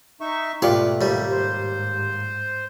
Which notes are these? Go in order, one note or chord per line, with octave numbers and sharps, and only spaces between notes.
D#4 E5 C#6
G#2 B2 A3 F4 G4 B4 D5 F5
D#2 G#2 G3
C5